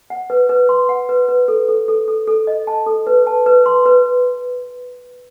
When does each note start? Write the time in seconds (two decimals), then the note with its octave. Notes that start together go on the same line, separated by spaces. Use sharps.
0.10 F#5
0.30 B4
0.49 B4
0.69 C6
0.89 F#5
1.09 B4
1.29 B4
1.48 A4
1.68 A4
1.88 A4
2.08 A4
2.28 A4
2.47 D#5
2.67 A5
2.86 A4
3.07 B4
3.27 A5
3.46 B4
3.66 C6
3.86 B4